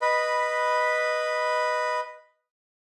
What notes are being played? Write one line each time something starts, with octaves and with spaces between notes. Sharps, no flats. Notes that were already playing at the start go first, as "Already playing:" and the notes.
B4 D#5 B5